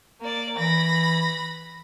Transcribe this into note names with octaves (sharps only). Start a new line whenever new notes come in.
A#3 D5
E3 B5 A#6